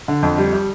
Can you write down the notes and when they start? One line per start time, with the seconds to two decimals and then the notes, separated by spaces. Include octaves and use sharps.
0.08 D3
0.22 F2
0.38 G3
0.53 G3